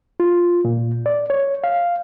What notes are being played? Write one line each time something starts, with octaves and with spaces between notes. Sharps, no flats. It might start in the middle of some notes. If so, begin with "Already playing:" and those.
F4
A#2
D5
C#5
F5